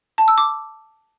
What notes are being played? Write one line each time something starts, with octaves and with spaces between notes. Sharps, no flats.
A5
E6
D6